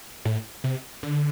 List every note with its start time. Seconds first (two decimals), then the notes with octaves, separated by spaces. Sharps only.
0.25 A2
0.64 C3
1.03 D3